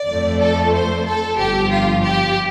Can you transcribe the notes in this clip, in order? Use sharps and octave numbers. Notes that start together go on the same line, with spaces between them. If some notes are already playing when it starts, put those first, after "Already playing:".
Already playing: D5
F2 F3 A3
A4
C5
A4
G1 G2 F3 G4
F4
G4